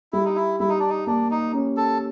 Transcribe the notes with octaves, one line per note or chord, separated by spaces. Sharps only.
G3 E4
D#4
E4
G3 E4
D#4
D4
D#4
A#3 D4
D#4
C#4
A4